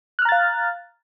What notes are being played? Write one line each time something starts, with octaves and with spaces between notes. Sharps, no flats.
F5 A#5 F6 F#6 A6